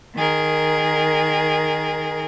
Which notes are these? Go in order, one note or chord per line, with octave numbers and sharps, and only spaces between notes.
D#3 G#4 A#4